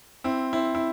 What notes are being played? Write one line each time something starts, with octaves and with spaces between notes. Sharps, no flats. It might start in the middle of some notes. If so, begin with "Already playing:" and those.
C4 E4
C4 E4
E4